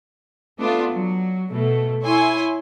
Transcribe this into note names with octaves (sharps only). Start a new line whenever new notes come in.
A3 B3 D4 F4
F#3
B2 A3
E4 C#5 G#5 C6